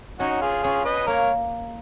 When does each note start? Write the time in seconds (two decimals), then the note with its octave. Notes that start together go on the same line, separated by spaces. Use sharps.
0.19 C#4 D#4 F#4
0.41 F4 G#4
0.63 C#4 F4 G#4
0.85 B4 D#5
1.07 A#3 A#4 C#5